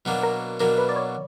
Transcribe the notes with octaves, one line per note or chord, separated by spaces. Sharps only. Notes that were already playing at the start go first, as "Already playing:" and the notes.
B2 F#3 A#3 D4
A#4
B2 F#3 A#3 D4 A#4
B4
D5
C#5